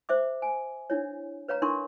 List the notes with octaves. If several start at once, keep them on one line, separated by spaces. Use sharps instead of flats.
C5 E5 D6
G#5
D4 E4 C#5
B4 C#5 F5 A#5
D4 E4 A#4 C6 C#6